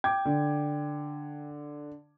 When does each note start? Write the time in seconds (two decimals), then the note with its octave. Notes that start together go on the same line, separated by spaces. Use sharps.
0.04 G5 D6 G#6
0.25 D3